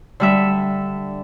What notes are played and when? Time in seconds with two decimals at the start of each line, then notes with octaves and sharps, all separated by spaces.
0.20 D3 G3 E5